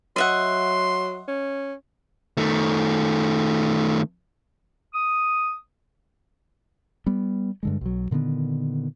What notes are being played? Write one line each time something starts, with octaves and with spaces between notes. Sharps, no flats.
F#3 D#5 E5 F#5 C6
C#4
D#3 A3
D#6
G3 B3
G2 D3 G#3
B1 F#3
A#2 D3 D#3 B3